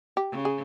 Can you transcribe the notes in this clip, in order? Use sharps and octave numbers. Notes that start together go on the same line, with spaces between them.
G4
C#3
G#4